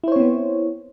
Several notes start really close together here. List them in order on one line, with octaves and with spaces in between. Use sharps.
E4 C5 C#5 C4 B3